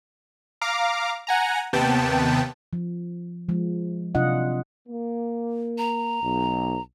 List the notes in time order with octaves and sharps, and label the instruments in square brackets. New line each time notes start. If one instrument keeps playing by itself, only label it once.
[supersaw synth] F5 A#5 D6
F#5 G#5 A#5
D#2 C3 B3 G5 A5
[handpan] F3
F3 G#3
C3 F#3 D4 F4 D#5 F#5
[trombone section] A#3
[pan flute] A#5
[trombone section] B1